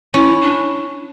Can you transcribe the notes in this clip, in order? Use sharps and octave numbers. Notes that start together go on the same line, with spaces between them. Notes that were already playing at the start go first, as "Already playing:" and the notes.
C#4 E4
D4